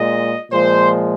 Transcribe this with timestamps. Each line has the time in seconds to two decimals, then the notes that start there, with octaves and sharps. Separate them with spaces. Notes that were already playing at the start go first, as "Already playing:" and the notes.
Already playing: A#2 G#3 D#5
0.51 A#2 F3 G#3 C5